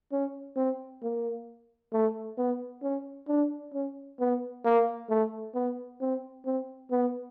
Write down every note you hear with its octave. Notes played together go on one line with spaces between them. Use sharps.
C#4
C4
A#3
A3
B3
C#4
D4
C#4
B3
A#3
A3
B3
C4
C4
B3